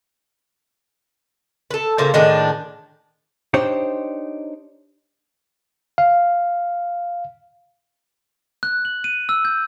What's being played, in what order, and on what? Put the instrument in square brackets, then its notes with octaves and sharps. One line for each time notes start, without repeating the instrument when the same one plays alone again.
[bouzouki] A4 B4
A#2 C#3 A#3 C5
A2 D#3 G#3 D4
[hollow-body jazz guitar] D4 D#4 G4 C5 C#5
[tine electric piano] F5
[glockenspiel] F#6
F#7
D#7
E6
G6